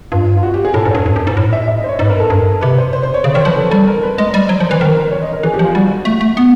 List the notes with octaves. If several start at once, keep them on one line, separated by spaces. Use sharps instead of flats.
G2 F4
F4
F#4
G4
G#4
A2 A4
G#2
G2 C#5
G2
F#2
G#2
A2
E5
E5
D#5
C5
C#5
G#2 D#5
B4
A#4
A4
G2 A#4
C3 B4
C5
C5
C5
C#5
C#3
D#3 C#5
C5
F3 B4
A4
G3 A4
A#4
B4
G#3 D#5
G3 D5
F#3 C5
F3 C5
E3 B4
D#3 A#4
A#4
C#5
D#5
A#4
E3 G#4
G4
F3
F4
G3 F#4
A3
A3
B3